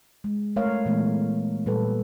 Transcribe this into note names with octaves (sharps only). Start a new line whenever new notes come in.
G#3
A3 A#4 C#5 F5
A#2 E3 G#3 A3 B3
A#2 G3 A4 B4